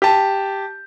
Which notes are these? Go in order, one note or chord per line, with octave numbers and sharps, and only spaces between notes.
G4 A5